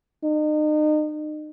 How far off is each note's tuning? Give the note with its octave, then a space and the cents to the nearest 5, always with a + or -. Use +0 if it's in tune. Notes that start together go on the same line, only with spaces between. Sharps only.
D#4 -35